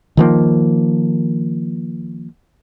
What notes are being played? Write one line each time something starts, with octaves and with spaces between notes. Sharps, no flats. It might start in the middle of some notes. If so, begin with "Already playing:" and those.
D#3 F3 A#3